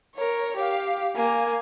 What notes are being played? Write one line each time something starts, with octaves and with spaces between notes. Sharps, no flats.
A#4 C#5
G4 F5
A#3 G#5